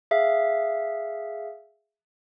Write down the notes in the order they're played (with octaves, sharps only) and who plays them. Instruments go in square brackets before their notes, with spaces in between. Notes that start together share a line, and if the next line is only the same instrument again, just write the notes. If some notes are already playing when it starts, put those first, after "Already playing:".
[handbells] G#4 E5 F5